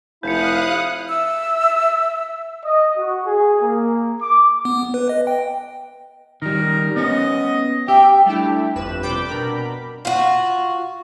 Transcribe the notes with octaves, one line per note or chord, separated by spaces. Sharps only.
F1 E4 F5 D#6 F#6 G6 C#7
E5 E6
D#5
F#4
G#4
A#3
D6
B3
B4
D#5
G5
D#3 G3 A#4
B3 C#4 D#5
G4 E5 G5
G3 A3 D4 E4 G4
G1 F2 B4 E7
C3 G3 G5 B5 D6 G6
B2 D4 A#4 B5
F4 F#4